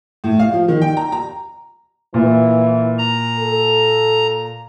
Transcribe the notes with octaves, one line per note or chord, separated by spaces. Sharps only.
A2
F5
F3
D#3
G5
A#5
A#5
A#2 E3
A#5
A4